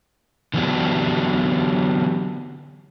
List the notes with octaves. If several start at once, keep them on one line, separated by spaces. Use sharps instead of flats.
D3 E3 F#3 B3 D4 G4